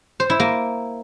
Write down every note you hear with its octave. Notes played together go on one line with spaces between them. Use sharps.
C5
E4
A#3